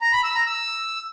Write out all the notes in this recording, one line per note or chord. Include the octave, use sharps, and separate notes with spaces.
A#5
B5
E6
A#5
E6